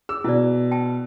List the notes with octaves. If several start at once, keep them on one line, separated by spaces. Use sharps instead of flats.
G#4 E6
B2 E4 D5
G5 A5